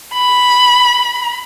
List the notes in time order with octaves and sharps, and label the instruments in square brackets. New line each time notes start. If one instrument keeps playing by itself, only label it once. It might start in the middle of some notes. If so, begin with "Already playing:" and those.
[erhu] B5